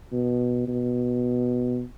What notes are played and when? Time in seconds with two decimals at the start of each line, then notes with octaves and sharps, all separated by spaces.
0.12 B2
0.68 B2